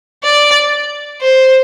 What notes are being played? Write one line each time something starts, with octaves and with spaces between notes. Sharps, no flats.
D5
C5